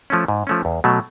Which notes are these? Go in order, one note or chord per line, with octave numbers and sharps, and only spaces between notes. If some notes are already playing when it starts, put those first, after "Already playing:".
F3 A3 C#4
G#2
F3 A3 C#4
E2
B2 F#3 A3